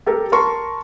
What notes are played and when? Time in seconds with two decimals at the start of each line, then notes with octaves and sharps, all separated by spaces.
0.06 G4 A4 A#4
0.32 A#4 A5 C6 C#6